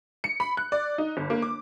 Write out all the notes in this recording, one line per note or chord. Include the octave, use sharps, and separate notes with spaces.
C#7
B5
F#6
D5
D#4
G1
A#3
D6